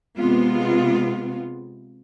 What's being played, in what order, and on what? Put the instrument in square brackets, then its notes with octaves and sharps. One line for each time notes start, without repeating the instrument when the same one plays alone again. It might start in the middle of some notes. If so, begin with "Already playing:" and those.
[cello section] C3 G#3 B3 F4